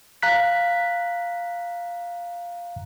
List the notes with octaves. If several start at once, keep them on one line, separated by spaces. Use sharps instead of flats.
F5 A#5 F#6 B6